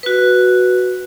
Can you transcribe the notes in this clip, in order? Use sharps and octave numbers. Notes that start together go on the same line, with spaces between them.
F#4 B4